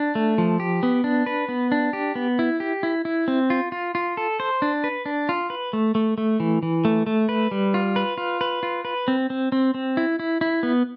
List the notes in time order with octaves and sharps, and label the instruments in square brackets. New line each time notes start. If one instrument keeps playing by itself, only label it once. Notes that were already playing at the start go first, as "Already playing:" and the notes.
Already playing: [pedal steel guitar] D4
A3
F3
G4
B3
D4
B4
B3
D4
G4
B3
E4
G4
E4
E4
C4
F4
F4
F4
A4
C5
D4
B4
D4
F4
B4
A3
A3
A3
E3
E3
A3
A3
B4
G3
F4
B4
F4
B4
F4
B4
C4
C4
C4
C4
E4
E4
E4
B3